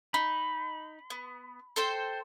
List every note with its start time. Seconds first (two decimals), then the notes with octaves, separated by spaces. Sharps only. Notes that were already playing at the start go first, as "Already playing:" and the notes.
0.14 D#4 B5
1.10 B3
1.76 A4 C5 G5